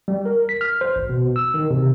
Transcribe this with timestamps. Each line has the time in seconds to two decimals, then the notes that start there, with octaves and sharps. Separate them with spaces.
0.08 G3
0.26 A#4
0.49 B6
0.61 F6
0.81 C5
0.96 G#1
1.09 B2
1.36 E6
1.54 D#3
1.71 C3